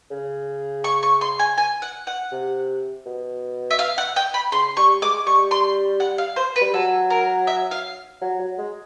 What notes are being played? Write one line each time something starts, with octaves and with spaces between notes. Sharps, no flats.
C#3
C#6
C#6
C6
G#5
G#5
F#5
F#5
C3
B2
E5
F5
F#5
G5
B5
C#3 C6
G3 C#6
G#3 D6
G3 C#6
C6
F#5
F5
C5
B4
G3
F#3 A4
A#4
E5
F5
F#3
F#3
G#3